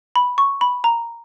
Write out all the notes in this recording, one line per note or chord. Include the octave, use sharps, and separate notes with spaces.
B5
C#6
B5
A#5